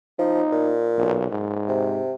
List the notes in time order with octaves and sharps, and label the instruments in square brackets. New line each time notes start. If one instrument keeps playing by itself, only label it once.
[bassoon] F3 [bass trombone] D#4
[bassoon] A#2
[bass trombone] B1
G#2
[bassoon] C3